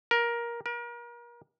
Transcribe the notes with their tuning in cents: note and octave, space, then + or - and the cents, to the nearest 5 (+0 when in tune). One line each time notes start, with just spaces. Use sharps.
A#4 +15
A#4 +35